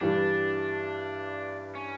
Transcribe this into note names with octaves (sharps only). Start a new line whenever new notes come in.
G2 E3 G3 D4
C#4